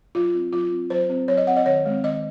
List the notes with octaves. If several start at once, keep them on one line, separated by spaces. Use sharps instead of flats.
F#3 F4
C4
F#3 F4
C4
F#3 C5
C4
F#3 C#5
D#5
C4 F#5
D#5
D#3 C#5
G#3 C4
D#3 D#5